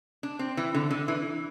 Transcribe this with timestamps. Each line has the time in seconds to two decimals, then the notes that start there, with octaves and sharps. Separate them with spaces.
0.23 D4
0.39 C4
0.57 E3
0.75 D3
0.91 D3
1.08 E3